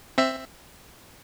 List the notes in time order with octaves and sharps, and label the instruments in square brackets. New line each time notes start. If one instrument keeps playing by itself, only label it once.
[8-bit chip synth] C4 E5